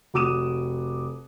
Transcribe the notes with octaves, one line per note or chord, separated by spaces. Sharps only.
F1 F#4 D6 D#6 D#7 E7